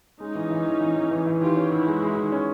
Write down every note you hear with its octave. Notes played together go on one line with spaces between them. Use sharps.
G#3 C#4 D#4
E3
E3
E3
E3
E3
E3
E3
D#3 F4 G4
C#4
D#3 E4 F#4
G#3
G#3
D#3
C#4